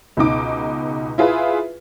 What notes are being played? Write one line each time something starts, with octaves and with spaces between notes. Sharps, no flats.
C#2 B2 D#4 D6
E4 F4 G#4 B4 E5